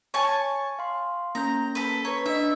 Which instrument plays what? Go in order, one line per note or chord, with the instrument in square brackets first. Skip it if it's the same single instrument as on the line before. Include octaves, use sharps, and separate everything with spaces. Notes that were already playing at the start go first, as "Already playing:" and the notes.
[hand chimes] C#5 [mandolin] G#5 A5 C#6
[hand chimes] F5 C6
[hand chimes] A#3 C#4 G6 [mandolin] A#5
[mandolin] A4 B4
[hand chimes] B4 A#5 [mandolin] C#5
[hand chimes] D4 D#5 [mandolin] E5